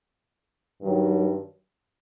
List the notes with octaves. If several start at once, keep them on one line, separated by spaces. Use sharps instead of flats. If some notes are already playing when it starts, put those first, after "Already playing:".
G2 D#3 F#3